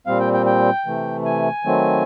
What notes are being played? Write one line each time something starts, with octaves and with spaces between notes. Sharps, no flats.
A#2 G3 C4 F5
G5
G5
G5
C3 E3 A3
G#5
D#3 F#3 A3 C4